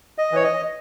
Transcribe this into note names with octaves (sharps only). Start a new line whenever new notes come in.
D#5
E3 C#5
D#5